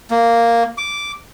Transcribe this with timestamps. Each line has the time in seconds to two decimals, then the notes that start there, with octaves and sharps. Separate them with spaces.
0.11 A#3
0.78 D6